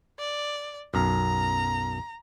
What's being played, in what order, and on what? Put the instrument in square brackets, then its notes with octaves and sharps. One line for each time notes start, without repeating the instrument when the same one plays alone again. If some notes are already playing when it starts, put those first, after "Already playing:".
[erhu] D5
[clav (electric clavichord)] B1 F#2 [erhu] A#5